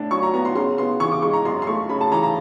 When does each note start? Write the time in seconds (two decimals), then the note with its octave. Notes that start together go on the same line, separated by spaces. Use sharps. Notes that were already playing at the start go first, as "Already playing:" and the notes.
Already playing: A2 D4
0.11 F#3 C#6
0.23 A#5
0.34 B3 A#5
0.45 C6
0.55 C#3 C6
0.78 B3 C6
1.00 E3 C#6
1.12 D6
1.22 G#3 C#6
1.33 A#5
1.45 F#2 C6
1.62 C6
1.67 A3 C#6
1.89 C#3 B5
2.01 A5
2.12 E3 A#5
2.23 A#5